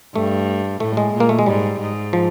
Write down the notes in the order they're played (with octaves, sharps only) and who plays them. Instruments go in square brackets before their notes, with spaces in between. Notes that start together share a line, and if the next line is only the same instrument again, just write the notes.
[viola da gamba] G2 [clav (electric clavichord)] A3
[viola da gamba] A2 [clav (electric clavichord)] A3
[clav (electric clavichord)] G#3
[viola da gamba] A#2
[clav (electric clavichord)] A#3
A3
G#3
[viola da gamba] G#2 [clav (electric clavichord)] G3
[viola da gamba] G#2
[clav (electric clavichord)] F3